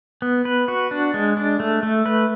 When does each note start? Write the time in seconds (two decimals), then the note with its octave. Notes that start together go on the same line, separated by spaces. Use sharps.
0.22 B3
0.45 B4
0.68 F#4
0.91 D4
1.14 G#3
1.37 D4
1.60 A3
1.83 A3
2.06 B4